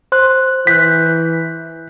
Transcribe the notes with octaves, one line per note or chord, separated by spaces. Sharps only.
C5 C6 F#6
E3 F#6 G6 B6